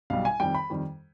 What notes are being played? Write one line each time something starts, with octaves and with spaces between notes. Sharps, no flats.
B1 B2 G3 F5
G#5
F2 D#3 G3 G5
B5
F2 D#3 G3